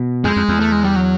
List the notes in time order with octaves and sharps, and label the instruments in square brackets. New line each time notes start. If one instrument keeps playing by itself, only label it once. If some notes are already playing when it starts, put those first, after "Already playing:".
Already playing: [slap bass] B2
[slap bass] F2 [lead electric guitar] G#3
[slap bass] F2
E2
[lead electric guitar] A3
G#3
G3
F#3